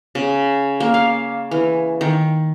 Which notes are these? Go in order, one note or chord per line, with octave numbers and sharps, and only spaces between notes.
C#3
A#3
F5
E3
D#3